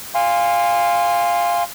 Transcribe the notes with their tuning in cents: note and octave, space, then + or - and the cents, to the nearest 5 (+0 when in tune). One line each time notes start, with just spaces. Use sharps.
F5 +0 G#5 -25 C6 +0